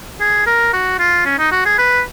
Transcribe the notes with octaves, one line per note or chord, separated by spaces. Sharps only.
G#4
A#4
F#4
F4
C#4
D#4
F#4
G#4
B4